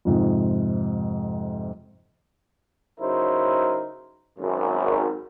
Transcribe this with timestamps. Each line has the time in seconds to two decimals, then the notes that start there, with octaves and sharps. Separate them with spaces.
0.05 F2 G#2 C3
3.00 C#3 F#3 D#4 E4 A#4 C5
4.39 G#1 F#2